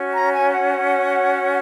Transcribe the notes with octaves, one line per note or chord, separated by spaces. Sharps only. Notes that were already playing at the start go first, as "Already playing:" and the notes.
Already playing: C#4 F#4 C#5
A#5
G#5
F#5